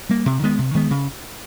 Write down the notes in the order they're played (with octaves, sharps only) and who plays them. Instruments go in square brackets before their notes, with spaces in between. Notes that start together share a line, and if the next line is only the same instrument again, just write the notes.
[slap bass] G3 A#3
C3
D#3 G#3 B3
C3
D#3 G#3 B3
C#3